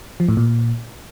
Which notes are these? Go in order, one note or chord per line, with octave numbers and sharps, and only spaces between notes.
F3
A2
A#2